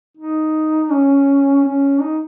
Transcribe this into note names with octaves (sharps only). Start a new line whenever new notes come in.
D#4
C#4
C#4
D#4